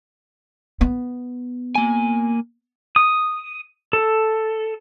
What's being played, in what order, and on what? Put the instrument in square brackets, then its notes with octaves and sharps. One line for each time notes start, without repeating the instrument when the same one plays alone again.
[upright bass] B3
[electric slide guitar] A#3 G#5
[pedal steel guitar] D#6
A4